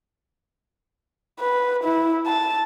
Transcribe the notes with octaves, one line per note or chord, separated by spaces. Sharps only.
B4
E4
A5